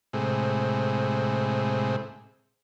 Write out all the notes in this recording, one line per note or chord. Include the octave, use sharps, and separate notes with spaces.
A2 C3 G#3